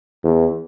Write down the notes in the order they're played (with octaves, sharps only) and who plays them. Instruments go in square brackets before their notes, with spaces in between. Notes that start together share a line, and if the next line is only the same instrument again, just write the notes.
[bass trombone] E2